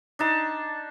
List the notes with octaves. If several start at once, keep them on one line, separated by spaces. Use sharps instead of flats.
D4 D#4 A5